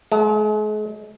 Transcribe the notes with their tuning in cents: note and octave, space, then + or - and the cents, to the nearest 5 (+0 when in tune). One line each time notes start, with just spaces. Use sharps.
G#3 +40